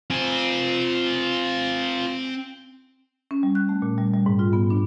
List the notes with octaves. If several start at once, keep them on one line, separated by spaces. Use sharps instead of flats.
C4 F4 G#5
C#4
G3
F#6
A3
A#2
G3
G3
G#2
F4
B3
D4